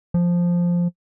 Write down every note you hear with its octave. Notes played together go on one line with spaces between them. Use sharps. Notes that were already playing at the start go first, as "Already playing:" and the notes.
F3